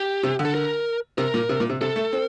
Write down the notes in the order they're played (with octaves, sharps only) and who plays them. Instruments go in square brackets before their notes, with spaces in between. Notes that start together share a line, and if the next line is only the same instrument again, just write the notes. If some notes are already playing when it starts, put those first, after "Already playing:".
Already playing: [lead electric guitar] G4
[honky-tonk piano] C3
D3
[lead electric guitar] A4
A#4
[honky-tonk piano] C3 [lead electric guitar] A#4
[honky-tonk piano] A#2
C3
A#2
C3
[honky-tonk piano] C3 [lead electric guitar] A4
[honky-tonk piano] A3
C4